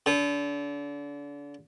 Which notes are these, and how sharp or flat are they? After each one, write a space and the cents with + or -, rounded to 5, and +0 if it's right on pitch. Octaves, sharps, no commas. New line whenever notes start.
D3 -35